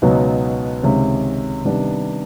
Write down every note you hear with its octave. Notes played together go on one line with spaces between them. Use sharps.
C#2 B2 F#3 B3 D#4
C#2 C3 D#3 G#3 C#4
C3 D#3 G3 B3 D4